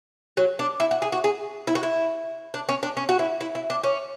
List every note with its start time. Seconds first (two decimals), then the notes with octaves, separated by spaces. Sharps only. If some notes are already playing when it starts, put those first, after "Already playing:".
0.37 F#3
0.59 D4
0.80 E4
0.91 F#4
1.02 G#4
1.12 F#4
1.24 G#4
1.67 E4
1.75 F#4
1.83 E4
2.54 D4
2.69 C#4
2.83 D4
2.97 C#4
3.09 F#4
3.19 E4
3.41 E4
3.55 E4
3.70 D4
3.83 C#4